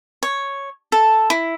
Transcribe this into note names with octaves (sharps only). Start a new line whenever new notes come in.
C#5
A4
E4